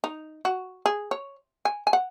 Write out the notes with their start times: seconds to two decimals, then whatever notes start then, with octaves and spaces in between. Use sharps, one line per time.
0.04 D#4
0.45 F#4
0.86 G#4
1.11 C#5
1.65 G#5
1.87 G#5
1.93 F#5